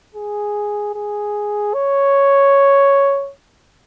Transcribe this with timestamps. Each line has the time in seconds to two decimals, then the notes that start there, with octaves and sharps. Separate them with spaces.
0.14 G#4
0.95 G#4
1.74 C#5